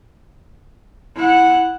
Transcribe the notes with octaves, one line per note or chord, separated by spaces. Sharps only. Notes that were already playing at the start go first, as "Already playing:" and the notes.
E4 F#5